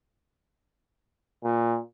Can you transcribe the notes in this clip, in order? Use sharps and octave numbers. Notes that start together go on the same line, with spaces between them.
A#2